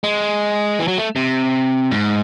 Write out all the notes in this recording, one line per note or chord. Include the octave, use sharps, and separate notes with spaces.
G#3
E3
F#3
A3
C3
G#2